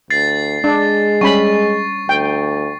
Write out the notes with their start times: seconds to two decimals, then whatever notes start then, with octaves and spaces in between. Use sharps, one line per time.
0.10 D2 A6 C7
0.64 G#3 D4
1.21 G3 C#4 B5 C#6
2.09 D2 G5